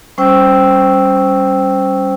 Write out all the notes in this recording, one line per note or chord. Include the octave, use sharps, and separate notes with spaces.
G3 C#4 C5 G5 C#6 E6